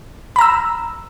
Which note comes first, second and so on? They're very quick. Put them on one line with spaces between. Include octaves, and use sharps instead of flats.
B5 A#5 E6